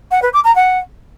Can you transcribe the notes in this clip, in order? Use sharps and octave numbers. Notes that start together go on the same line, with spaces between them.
F#5
B4
D6
A#5
F#5